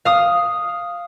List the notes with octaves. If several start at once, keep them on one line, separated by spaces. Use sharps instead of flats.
F5 D#6